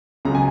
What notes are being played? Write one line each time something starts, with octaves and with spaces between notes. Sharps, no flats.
C#2 C#3 F#3 A#5
G#5